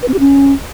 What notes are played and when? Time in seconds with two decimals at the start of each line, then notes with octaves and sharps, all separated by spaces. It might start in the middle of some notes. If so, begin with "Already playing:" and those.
0.03 B4
0.08 C4
0.14 G4
0.20 C#4